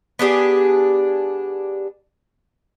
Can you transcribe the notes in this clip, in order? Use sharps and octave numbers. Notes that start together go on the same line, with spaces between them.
B3 D4 G4 G#4